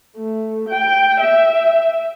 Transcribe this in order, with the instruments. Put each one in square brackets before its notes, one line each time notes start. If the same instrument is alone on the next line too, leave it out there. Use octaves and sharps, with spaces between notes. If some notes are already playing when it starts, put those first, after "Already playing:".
[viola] A3
G5
E5